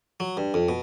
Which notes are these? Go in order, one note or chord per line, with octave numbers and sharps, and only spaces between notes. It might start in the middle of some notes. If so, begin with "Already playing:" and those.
F#3
G2
F2
B2